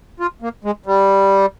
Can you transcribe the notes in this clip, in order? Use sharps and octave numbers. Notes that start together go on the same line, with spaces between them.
F4
A#3
G#3
G3